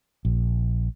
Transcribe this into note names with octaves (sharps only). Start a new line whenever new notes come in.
A#1